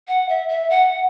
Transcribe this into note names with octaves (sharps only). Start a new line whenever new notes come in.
F#5
E5
E5
F#5